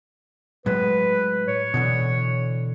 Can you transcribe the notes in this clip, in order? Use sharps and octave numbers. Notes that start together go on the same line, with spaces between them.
A2 F#3 G#3 B4
C#5
B2 D3 E3